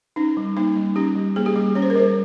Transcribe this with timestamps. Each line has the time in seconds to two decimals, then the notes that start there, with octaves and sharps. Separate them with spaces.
0.16 C#4 D#4
0.37 G3
0.57 A#3 D#4
0.76 G3
0.96 C#4 G4
1.15 G3
1.36 A#3 G#4
1.46 G4
1.56 G3 G#4
1.75 C#4 C#5
1.82 C5
1.90 A#4
1.96 G3 C5